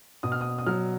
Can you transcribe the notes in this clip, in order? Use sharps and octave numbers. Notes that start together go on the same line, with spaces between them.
B2 D#6
F6
D#6
D#6
F#3 F6